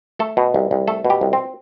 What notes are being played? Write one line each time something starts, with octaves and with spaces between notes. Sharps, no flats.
A3 A4
B2
C2
C2
A3 A4
B2
G4
C2
C4